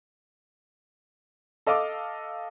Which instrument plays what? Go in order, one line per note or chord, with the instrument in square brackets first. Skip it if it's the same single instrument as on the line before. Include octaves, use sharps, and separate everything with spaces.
[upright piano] A4 D#5 F5 D6